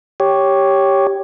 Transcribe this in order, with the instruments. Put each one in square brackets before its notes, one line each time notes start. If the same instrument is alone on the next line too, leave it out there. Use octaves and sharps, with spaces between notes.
[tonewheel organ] G4 C#5